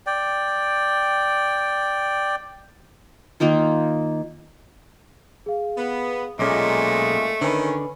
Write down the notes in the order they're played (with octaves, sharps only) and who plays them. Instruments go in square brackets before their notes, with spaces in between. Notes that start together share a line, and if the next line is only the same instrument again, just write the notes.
[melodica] D5 G5
[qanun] D#3 A#3 D#4 F4
[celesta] G#4 F5
[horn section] B3
[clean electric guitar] B1 C#4 [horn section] A#2 G#3 [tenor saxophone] A3 [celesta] D6 F6
[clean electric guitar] D3 [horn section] D#3 C#4 [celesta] B4 G#5 B5